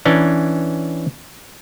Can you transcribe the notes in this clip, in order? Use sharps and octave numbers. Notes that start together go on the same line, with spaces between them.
E3 C#4 D4